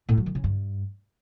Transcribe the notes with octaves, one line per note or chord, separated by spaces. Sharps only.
A2
F#3
D#3
C#3
G2